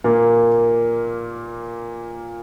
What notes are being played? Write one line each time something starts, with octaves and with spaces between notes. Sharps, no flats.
A#2 A#3